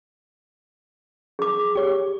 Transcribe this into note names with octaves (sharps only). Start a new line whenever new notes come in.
G#4 D6
G4 C#5